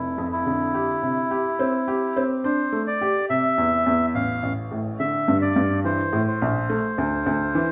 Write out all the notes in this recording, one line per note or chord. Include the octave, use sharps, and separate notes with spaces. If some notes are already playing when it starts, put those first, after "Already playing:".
Already playing: F1 E4
F2
E4
D3
G4
C3
G4
C4
G4
C4
D4 C5
A3
D5
G4
C3 E5
E2
E2
A1 F5
A1
A2
D3 E5
G2
D5
G2
E3 C5
A2
C5
A#1
A3
D2
D2
E3